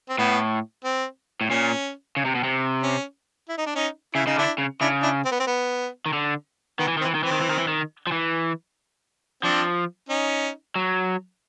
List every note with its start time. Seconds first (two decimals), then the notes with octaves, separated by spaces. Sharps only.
0.09 C4
0.18 A2 B3
0.85 C4
1.41 A2
1.50 A#2 C#4
2.16 C#3
2.25 C3
2.35 B2
2.44 C3
2.83 C#4
3.49 E4
3.58 D#4
3.66 D4
3.75 C#4 D#4
4.15 C#3 E4
4.26 C#3 D#4
4.36 D3 D4 E4
4.58 C#3
4.81 C#3 D4 E4
5.02 D4 E4
5.25 C4
5.32 B3
5.40 C4
5.47 B3
6.06 D#3
6.13 D3
6.79 D#3 B3
6.88 E3
6.97 D#3
7.01 C4
7.06 E3
7.15 D#3
7.23 E3 C4
7.32 D#3
7.41 E3
7.50 D#3
7.59 E3
7.68 D#3
8.07 F3
8.12 E3
9.43 F3 C4 D4
10.09 C#4 D#4
10.75 F#3